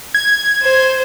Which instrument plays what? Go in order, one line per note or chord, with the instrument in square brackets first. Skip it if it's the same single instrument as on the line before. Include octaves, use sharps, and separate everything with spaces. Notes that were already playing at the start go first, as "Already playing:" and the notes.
[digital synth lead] G#6
[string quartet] C5